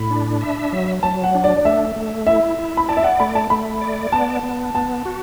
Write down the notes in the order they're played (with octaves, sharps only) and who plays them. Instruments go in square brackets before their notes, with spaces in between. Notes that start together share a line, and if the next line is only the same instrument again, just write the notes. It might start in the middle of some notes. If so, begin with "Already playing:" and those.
Already playing: [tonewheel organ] A2 [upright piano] B5
[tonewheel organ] D4
E5
F#3
[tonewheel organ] F#3 [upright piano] A5
[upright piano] F#5
[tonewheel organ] D4
[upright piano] D5
D5
[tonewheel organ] A3 [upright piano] E5
[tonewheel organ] A3
[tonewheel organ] E4 [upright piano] E5
[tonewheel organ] E4
[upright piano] B5
[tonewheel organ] D5 [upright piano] A5
[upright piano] E5
F#5
[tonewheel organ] A3 [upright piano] B5
[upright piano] A5
[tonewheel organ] A3 [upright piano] B5
[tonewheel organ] D5
[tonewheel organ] B3 [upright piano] A5
[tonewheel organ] B3
[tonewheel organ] B3 [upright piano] A5
[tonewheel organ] F#4